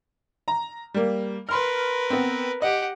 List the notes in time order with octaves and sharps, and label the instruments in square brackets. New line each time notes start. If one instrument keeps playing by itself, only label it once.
[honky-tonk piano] A#5
G3 A#3
[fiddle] A#4 B4 [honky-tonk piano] B5 C6 F6
[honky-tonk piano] B3 C4
[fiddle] G4 F#5 [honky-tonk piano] D#5